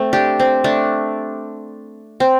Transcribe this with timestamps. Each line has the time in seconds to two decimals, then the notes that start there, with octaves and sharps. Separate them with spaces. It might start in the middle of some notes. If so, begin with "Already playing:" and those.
Already playing: A3 C4
0.13 D4 G4
0.40 C4
0.64 A3 D4
2.20 C4